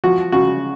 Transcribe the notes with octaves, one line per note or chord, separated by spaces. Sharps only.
F3 F#4
C#3 F#4